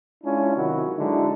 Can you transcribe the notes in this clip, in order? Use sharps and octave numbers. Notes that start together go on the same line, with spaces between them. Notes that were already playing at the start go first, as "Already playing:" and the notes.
G#3 C#4 D4 E4 F4
C3 D#3 F#3 E4 F#4
D3 F#3 G#3 D#4 E4